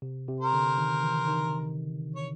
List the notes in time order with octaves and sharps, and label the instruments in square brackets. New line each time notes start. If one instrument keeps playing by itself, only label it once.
[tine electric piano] C3
C3
[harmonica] A#4 C5
[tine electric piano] D3
D#3
E3
D#3
[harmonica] C#5